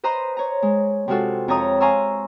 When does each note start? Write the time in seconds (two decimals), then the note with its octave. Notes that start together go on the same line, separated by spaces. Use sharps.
0.04 B4 C5 D#5 A#5 C6
0.37 C#5 A#5
0.62 G#3
1.08 C3 G#3 F4 F#4 A4
1.48 F2 C#5 D#5 A#5 D#6
1.80 F5 G#5 A#5 C6 C#6 E6